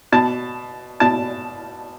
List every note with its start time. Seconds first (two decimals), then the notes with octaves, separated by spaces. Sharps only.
0.12 B2 A5
1.00 B2 A5